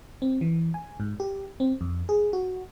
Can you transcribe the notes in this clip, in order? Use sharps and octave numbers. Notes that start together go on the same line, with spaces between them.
C4
E3
G#5
G#2
G4
C4
F2
G#4
F#4